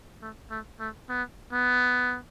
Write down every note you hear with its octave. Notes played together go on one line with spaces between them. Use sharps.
A3
A3
A3
B3
B3